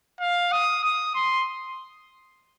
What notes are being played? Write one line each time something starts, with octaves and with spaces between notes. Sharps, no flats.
F5
D#6
D#6
C6